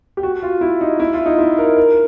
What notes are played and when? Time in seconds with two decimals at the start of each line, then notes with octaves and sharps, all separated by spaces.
0.17 G4
0.23 F#4
0.43 F4
0.61 E4
0.81 D#4
1.00 E4
1.13 F4
1.26 D#4
1.39 E4
1.58 A#4
1.77 A#4